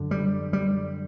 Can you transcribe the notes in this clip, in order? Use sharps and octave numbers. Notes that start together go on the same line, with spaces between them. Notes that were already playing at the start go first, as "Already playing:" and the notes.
Already playing: F#2 D3
G3
G3